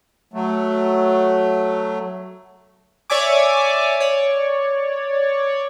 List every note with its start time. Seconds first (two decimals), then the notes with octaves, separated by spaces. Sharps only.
0.34 F#3 A3
3.10 C#5 D5 E5 G#5 D6
4.00 C#5 D5